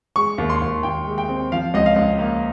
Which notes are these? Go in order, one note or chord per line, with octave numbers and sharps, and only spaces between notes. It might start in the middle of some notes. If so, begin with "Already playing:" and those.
G#3 C#6
D#2
C6
D#2
D#2 G5
G#3
G5
C4
F3 F5
C#2 D#5
F5
C#2
A#3